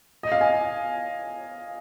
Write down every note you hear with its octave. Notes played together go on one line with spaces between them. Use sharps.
D#5
F5
G#5